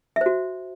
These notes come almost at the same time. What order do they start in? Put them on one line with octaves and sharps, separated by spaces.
E5 C5 F#4